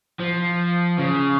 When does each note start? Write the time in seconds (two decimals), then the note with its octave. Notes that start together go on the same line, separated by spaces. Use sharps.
0.19 F3
0.98 C#3